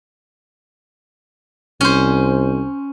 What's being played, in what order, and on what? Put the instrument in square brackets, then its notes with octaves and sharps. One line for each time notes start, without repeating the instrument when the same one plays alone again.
[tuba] C2 [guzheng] C#4 C5